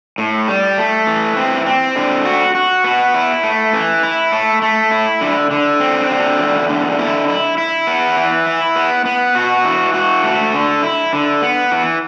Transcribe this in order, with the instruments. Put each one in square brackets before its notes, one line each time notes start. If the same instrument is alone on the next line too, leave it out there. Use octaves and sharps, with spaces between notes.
[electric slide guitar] A2
G3
A3
E3
C4
C4
D3
F#4
F#4
B3
E4
A3
E3
E4
A3
A3
E4
D3
D3
C4
D3
E2
D3
E4
E4
E4
B3
E3
E4
B3
B3
F#4
E3
F#4
A3
D3
E4
D3
B3
E3